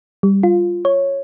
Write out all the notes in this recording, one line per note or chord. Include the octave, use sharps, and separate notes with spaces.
G3
F4
C#5